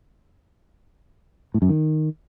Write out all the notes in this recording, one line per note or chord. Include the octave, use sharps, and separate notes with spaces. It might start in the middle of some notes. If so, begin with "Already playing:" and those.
A2
F#2
D#3